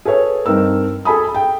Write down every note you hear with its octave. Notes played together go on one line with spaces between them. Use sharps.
G#4 A4 B4 C#5
G2 C4 D#4 A#4 E6
G#4 A4 G#5 B5 D#6
G5